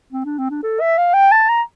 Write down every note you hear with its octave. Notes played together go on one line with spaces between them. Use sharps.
C4
D4
C4
D4
A4
E5
F5
G5
A5
A#5